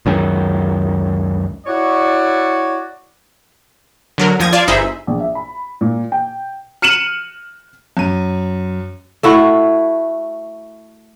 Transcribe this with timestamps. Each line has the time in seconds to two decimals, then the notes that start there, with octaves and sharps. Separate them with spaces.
0.06 C#2 F#2 D#3
1.67 E4 F#4 C#5 D5
4.18 D3 F#3 A#4
4.39 D#2 F3 D#6 G#6 A#6
4.53 F4 D5 F5 A5 G#6 D#7
4.68 G1 D#4 G#4 C5 E5 B5
5.07 A#1
5.20 E5
5.35 B5
5.81 A#2
6.12 G5
6.82 F6 C#7 D#7 E7 F#7
7.97 F#2 D#7
9.23 A3 E4 F#4 F#5